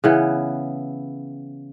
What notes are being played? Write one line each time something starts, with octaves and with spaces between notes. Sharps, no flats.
C#3 E3 B3